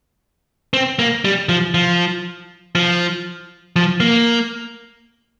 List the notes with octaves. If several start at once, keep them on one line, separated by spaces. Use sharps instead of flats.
C4
A#3
G3
F3
F3
F3
F3
A#3